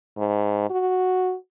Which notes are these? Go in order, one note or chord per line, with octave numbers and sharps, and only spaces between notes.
G#2
F#4